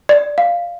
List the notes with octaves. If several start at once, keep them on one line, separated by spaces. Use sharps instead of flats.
D5
F5